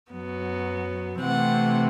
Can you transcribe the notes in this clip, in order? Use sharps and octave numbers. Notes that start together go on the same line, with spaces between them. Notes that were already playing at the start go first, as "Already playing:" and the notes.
F#2 F#3 B3
C3 E3 A3 C4 F#5